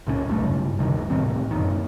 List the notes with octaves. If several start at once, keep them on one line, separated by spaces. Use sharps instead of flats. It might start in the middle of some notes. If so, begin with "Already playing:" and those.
C#2 A#2 G3 C#4
E1 B1 G2 A3
G2 C#3
D2 G2 C3 D#3
C2 A2 D#3 C4
F#2 A#2 D#3